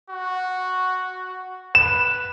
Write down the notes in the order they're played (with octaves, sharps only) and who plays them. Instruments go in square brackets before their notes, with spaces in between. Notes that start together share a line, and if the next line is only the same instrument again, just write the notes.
[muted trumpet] F#4
[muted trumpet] B4 [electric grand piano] E7